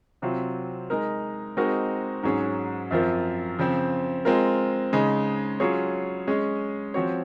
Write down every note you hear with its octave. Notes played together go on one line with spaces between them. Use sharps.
C3 F#3 C4 F4
G#3 D#4 A#4
G#3 C4 D#4 F#4 A#4
G#2 F#3 C#4 G#4
F#2 F3 C4 F4 A#4
C#3 F3 C4
G#3 C4 F4 A#4
C#3 G#3 D#4
F#3 C#4 F4 G#4 C#5
G#3 C#4 G#4
F3 C4 F#4 C#5